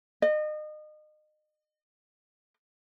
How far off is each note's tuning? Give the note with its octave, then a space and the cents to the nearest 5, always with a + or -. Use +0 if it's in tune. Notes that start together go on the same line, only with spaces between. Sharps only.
D#5 -30